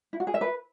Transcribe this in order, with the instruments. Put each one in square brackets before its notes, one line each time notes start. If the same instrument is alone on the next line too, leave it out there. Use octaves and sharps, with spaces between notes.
[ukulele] E4
F#4
G#4
E5
B4